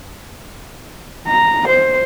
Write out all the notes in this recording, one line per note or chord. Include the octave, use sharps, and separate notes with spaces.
A#5
C5